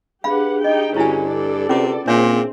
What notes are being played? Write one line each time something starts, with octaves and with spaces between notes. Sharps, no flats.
D4 G4 G#4 B4 F5 F#5 B5
D#4 G4 D#5 G5
G2 D3 C#4 E4 F#4 G#5
A4 D5
C3 C#4 F4 G#4 B4 D6
A#2 C4 D4 G#4 C#5 E5